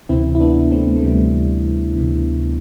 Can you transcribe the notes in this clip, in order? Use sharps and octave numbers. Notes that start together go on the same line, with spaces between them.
D2 C3 E3 C4 E4
E4
B3 D4
A3 C4
A3
D2 C3 E3 G3
D2 C3 E3